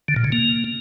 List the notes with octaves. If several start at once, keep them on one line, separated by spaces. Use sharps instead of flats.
D3
A#2
C#3
A#3